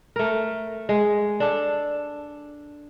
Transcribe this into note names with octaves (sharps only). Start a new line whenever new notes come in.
A3 A#4
G#3
D4 A4